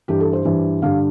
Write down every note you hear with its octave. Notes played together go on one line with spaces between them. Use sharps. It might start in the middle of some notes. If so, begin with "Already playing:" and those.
G2 E3 G4
A4
C5
G2 E3
G2 D3 F5